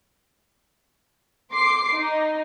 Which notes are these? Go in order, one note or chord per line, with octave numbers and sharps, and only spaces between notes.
C6 D6 C7
D#4